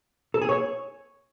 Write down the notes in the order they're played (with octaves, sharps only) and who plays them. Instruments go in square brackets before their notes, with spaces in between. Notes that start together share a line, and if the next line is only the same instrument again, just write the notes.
[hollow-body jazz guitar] A4
G#4
C#5